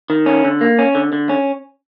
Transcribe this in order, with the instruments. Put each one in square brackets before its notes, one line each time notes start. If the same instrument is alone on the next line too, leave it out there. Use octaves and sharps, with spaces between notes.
[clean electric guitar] D#3
C#4
D3
A#3
C#4
D3
D3
C#4